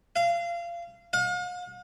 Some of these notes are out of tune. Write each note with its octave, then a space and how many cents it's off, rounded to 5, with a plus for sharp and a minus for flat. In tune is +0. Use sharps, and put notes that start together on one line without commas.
F5 -25
F5 +45